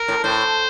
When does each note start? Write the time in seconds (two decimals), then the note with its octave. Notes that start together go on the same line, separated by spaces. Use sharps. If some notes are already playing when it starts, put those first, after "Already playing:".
Already playing: A#4
0.08 A2
0.23 A2 C5